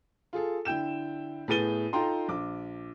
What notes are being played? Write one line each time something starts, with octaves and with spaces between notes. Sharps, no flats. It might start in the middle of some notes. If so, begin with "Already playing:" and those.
F4 G#4 A4
D3 E4 G5 G6 E7
A2 B3 G#4 A6 D#7 G7
D#4 F4 A4 G5 A#5 C6
A#1 D6